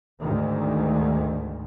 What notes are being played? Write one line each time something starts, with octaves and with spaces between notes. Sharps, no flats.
D2 G#2 D#3